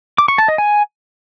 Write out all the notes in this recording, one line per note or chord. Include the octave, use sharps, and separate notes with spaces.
D6
C#6
A5
D#5
G#5